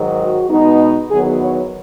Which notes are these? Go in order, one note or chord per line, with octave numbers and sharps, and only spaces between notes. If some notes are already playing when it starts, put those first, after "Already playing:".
Already playing: G#2 D#3 F#3
F#4
B2 G#3 B3 D#4
E2 D#3 F#3 B3 G#4
C#5